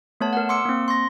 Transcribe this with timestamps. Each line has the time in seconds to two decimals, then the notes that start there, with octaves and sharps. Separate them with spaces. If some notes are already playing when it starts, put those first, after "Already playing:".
0.21 A3 B3 C#5 A5
0.33 A#4 F#5
0.49 C6 D6 E6 C#7
0.65 A#3 C4
0.88 C6 C#6 A#6